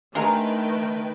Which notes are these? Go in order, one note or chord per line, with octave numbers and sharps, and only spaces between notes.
D#3 G#3 A3 D4 A#4 B4 G5 A#5